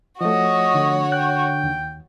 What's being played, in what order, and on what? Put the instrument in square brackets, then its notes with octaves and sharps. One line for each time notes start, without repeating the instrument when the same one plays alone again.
[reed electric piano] F3 A3 [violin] F#4 C#5 [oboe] D#5
[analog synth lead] D3
[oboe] G5 [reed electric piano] F#6
[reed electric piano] D#2